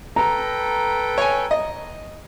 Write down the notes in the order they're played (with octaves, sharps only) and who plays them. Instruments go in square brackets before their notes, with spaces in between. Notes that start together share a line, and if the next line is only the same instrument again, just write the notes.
[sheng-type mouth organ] A4 B4 G5 [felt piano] A#5
[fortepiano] C#5 G#5
D#5